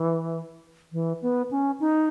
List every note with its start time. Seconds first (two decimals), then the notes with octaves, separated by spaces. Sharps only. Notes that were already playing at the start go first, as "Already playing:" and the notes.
Already playing: E3
0.93 E3
1.22 B3
1.51 C#4
1.80 D#4